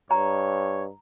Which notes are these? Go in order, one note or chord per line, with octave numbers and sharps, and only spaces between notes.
G2 C#5 A#5